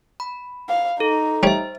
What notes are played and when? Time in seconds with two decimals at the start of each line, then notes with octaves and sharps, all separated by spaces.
0.20 B5
0.69 F5
1.00 D#4 A4
1.43 G3 C5 C#5 E5